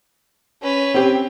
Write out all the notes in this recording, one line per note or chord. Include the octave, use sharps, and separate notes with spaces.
C#4 B4
C4 G4